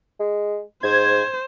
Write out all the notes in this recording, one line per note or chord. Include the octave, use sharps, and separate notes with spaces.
G#3
G#2 C5 G#6